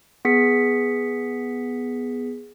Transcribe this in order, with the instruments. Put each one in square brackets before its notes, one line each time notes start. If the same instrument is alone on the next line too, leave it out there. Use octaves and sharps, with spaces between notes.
[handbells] B3 G#4 B6 C#7